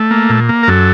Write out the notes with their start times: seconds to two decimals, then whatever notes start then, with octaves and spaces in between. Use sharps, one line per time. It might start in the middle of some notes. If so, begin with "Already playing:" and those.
Already playing: A3
0.11 A#3
0.30 A#2
0.49 A#3
0.63 A#4
0.68 F#2 A4